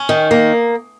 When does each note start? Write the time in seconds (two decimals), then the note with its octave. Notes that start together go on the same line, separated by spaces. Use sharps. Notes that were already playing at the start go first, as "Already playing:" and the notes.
Already playing: C#4
0.09 D#3
0.31 A#3